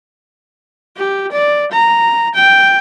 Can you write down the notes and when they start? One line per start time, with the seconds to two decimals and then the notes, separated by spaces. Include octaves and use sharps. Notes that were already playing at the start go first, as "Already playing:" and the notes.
0.97 G4
1.32 D5
1.72 A#5
2.35 G5